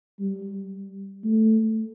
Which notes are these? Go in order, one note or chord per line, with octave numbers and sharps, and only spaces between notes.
G3
A3